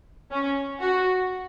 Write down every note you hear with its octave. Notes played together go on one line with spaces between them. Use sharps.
C#4
F#4